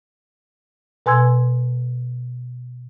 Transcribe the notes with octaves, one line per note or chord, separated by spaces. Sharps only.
B2 B4 G#5 C6 E6 G#6